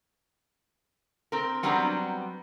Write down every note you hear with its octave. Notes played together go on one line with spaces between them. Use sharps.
C4 A#4
F#3 G3 B3 C4 D4 A#5